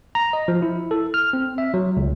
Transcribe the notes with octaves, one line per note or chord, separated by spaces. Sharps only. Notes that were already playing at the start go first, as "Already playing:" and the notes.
A#5
D#5
F3
E4
A4
F6
C4
E5
F#3
C#2